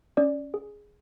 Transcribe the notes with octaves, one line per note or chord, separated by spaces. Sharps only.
C#4 D5
G#4